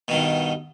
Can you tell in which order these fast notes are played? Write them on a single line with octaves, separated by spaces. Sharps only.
B2 D#3 G2